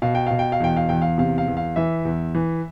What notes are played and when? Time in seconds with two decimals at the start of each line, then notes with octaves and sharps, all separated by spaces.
0.02 B2 F5
0.15 G5
0.27 B2 F5
0.39 G5
0.52 F5
0.60 E2 G5
0.76 F5
0.89 E2 G5
1.02 F5
1.18 C3 F5
1.38 F5
1.48 E2
1.57 F5
1.76 E3 E5
2.05 E2
2.35 E3